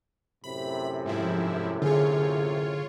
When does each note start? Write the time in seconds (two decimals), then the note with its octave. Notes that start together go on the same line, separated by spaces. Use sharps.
0.44 F#2 A2 C3 B5
1.06 G#2 F3 E4
1.82 D3 F4 G#4 C#5